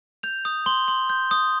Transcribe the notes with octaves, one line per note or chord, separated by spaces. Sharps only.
G6 F7
D#6
C6 G7
C6
G6
D#6